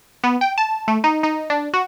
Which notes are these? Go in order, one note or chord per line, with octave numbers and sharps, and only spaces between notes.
B3
G5
A5
A3
D#4
D#4
D4
F#4